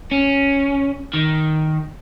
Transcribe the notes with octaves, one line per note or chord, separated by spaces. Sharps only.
C#4
D#3